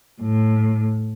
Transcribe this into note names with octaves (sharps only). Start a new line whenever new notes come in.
A2